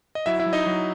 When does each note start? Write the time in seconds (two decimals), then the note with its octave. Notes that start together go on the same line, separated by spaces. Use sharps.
0.15 D#5
0.26 F#3 E4 E5
0.40 E4 E5
0.46 F#3
0.53 D#4 D#5
0.66 F#3